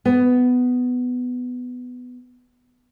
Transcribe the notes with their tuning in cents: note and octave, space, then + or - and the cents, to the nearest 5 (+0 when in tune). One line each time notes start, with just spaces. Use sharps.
B3 +10